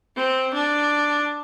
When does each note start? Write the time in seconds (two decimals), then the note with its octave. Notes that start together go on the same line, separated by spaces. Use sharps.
0.17 C4
0.54 D4